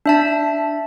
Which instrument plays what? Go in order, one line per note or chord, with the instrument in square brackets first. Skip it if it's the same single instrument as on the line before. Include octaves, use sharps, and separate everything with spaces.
[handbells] D4 E5 A5